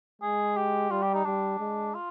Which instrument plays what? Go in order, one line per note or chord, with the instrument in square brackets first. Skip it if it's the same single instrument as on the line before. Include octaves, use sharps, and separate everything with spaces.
[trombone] G#3 [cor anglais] G#4
[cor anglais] G4
[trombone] G3 [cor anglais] F4
[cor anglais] G4
D#4
[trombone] G3 [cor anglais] D4
[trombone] G#3
[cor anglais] F4